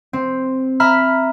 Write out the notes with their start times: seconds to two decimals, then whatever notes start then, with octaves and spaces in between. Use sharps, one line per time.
0.13 C4
0.80 E5 A#5 B5 F6